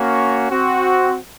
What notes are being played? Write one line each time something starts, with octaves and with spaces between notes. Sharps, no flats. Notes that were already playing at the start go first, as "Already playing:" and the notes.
Already playing: A#3 C#4 F#4
C4 F#4